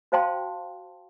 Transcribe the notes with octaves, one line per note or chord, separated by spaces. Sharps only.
F#4 C5 F5 G5 A5 C6